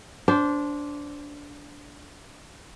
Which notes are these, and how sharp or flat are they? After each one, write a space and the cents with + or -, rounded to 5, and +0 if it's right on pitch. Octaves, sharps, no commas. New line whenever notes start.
D4 -15 C5 +0